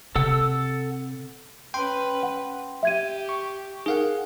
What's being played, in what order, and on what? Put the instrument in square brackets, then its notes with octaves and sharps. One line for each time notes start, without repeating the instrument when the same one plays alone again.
[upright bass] C3 [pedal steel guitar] A4 F#5 E6
[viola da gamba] C#4 B4 [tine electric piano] G5 C6
[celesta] F#5
[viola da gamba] G4 [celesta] E5 G#6 D#7
[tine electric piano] C#6
[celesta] D#4 A#4 [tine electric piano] G#4 F5 F#5